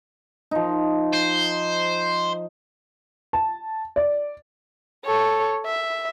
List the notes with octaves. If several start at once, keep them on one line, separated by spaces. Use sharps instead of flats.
F3 D#4
C5
A5
D5
A4 C#5
E5